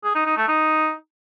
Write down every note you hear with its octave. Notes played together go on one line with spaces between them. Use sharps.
G#4
D#4
D#4
A3
D#4